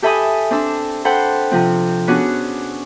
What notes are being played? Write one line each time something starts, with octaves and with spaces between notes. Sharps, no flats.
G4 A4 E5 G#5 B5 D#6
C4 D4 A5 E6
A4 C5 F#5 G5 B5
C3 F3 C4
B3 C#4 D4 F#4 G#4